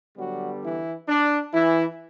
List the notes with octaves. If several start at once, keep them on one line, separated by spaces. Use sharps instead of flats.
D3 F#3 G3 B3 F#4
E3 E4
D4
E3 E4